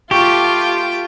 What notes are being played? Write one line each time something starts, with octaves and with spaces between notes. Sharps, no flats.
A3 F4 G4 G5 C#6